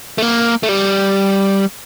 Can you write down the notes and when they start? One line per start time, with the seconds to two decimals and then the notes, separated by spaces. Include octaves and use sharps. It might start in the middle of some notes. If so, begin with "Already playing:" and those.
0.18 A3
0.22 A#3
0.63 A3
0.69 G3